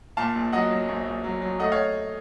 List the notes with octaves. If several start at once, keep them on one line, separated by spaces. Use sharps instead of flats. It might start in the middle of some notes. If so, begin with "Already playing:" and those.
A#2 F5 A5
A#1
F#3 D#5 F#5
F#3
A#1
A#1
F#3
F#3
A3 D#5 F#5
C#5 F5